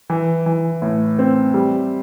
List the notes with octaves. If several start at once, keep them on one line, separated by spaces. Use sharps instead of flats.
E3
E3
A2
C4
G3